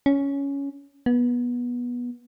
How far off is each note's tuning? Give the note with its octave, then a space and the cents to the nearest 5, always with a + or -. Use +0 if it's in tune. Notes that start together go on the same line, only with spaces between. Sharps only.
C#4 +10
B3 -20